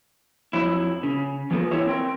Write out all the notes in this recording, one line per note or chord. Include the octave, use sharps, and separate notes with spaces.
F2 F#3 E4
C#3
E3 F3 A3 B3 G#4 A#4
E3 A3 E4 G4 C#5 E5
C4 A#4 G5